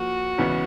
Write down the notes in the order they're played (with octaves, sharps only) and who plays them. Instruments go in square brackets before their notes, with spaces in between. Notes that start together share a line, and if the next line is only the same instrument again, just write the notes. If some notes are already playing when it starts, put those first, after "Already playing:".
Already playing: [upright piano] F3 A#3 [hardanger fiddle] F#4
[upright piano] E2 C#3 E3 G#3 B3